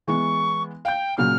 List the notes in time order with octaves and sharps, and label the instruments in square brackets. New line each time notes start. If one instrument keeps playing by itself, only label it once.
[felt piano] E3 G#3 B3 [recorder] C#6
[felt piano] F5 G6 [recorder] G5
[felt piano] A#2 C#3 F#3 [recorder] F6